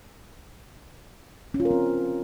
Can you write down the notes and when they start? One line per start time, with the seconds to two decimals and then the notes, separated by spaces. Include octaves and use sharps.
1.54 C#4
1.60 F4
1.65 A#4
1.71 C4